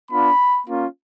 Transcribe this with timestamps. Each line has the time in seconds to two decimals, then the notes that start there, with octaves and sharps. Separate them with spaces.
0.11 B3 D4 F4 B5
0.66 A#3 C#4 F4